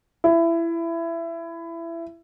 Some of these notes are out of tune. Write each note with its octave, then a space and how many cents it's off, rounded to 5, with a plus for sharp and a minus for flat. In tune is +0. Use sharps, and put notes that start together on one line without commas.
E4 +20